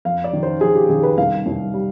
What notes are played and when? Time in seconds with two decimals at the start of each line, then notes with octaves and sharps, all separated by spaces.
0.05 F2 F5
0.24 D5
0.33 D#3
0.43 C5
0.61 F2 G#4
0.75 G4
0.89 D#3 G#4
1.03 B4
1.18 C2 F5
1.46 C2
1.74 G3